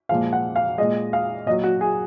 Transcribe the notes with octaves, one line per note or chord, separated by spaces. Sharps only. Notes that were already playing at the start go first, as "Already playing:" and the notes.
A#2 F3 G#3 F5
F#5
F5
A#2 G#3 D#5
F5
A#2 F#3 D#5
F#4
G#4